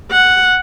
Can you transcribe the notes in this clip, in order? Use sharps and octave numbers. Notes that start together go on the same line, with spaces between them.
F#5